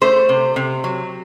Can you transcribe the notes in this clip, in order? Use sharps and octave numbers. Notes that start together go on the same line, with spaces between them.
A3 C5
C3
C3
F#3